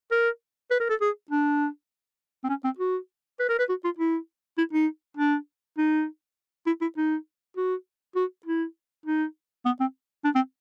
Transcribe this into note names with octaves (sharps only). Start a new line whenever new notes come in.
A#4
B4
A#4
A4
G#4
D4
C4
C#4
C4
F#4
B4
A#4
B4
F#4
F4
E4
E4
D#4
D4
D#4
E4
E4
D#4
F#4
F#4
E4
D#4
B3
C4
D4
C4